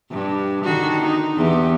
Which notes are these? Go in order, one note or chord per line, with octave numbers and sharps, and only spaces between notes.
G2
D3 D#3 F#4
D#4
E2 G4